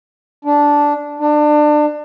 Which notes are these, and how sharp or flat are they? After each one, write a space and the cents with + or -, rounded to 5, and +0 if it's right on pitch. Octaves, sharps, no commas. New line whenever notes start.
D4 -10
D4 +25